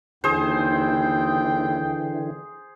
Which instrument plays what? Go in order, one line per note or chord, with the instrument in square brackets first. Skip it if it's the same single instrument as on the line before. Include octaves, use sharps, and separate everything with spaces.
[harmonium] D#2 [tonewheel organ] D3 E3 [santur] G#4 C5 [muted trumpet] G5